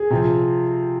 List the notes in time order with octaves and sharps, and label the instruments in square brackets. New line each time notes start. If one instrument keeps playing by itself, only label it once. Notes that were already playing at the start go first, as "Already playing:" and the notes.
Already playing: [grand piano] G#4
C3 F3 C4